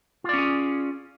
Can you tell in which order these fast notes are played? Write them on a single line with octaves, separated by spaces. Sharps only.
F4 D5 C#4 G#4